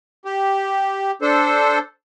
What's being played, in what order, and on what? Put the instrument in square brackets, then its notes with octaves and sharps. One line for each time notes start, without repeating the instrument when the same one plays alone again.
[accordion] G4
D4 A4 C5